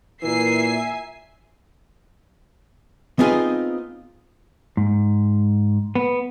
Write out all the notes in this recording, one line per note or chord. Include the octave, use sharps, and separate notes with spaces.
A#2 E3 A#4 E5 G#5 C7
B3 C4 D#4 F4 G#4
G#2
B3